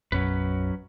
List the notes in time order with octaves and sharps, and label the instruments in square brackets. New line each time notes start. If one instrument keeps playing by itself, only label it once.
[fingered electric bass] B1 F#2 [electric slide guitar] F#3 C#4 B4